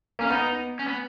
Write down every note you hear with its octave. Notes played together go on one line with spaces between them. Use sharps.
A#3 C#4
B3 D#4
C#4
B3